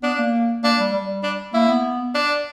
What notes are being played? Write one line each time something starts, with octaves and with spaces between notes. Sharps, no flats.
B3 D4
A#3
A#3 D4
G3
G3
D4
A#3 E4
B3
D4